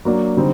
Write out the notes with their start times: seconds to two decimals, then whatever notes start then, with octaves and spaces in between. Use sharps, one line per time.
0.05 F#3 A#3 D4
0.37 D3 G3 C4 D#4